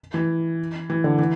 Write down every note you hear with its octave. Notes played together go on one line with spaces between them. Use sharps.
E3
E3
D3
E3